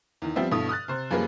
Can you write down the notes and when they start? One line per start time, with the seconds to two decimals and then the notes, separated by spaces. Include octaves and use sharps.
0.22 E2 D#3
0.36 F3 G3 B3 C4 E5
0.51 G2 B2 E4 A4 D#6
0.69 D#6 F6 F#6 A6
0.88 C3 C5
1.11 F#2 F3 G3 A#3 G#4 B4